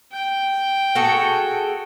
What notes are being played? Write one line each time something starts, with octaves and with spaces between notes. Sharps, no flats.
G5
F#4 G#4 A4